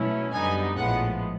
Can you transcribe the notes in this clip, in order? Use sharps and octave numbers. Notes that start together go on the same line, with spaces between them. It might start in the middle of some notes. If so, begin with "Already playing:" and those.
Already playing: B2 F#3 A3 C#4 E4
F#2 D3 G3 B3 D#4 G#5
A#1 A2 F3 G#3 B3 F#5